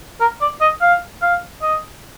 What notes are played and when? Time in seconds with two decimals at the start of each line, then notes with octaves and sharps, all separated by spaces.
0.20 A#4
0.41 D5
0.61 D#5
0.81 F5
1.22 F5
1.62 D#5